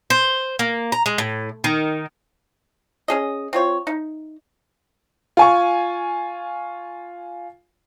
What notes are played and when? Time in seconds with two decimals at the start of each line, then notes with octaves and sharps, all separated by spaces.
0.10 C5
0.59 A#3
0.92 A#5
1.06 G#3
1.18 A2
1.64 D#3
3.08 C#4 G#4 D#5
3.53 C4 F4 C#5
3.87 D#4
5.37 F4 G#5 C#6